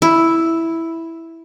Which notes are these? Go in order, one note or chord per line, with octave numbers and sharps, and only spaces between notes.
E4